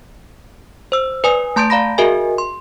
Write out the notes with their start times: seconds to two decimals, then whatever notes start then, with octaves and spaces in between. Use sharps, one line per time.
0.92 C5 E6
1.24 B4 D5 G#5 D#6
1.56 A3 A5 C6 G6 A6 D7
1.70 D5 F5 A#5 B5 A#6
1.98 F#4 G#4 A#4 D#5 E5 G#5
2.38 C6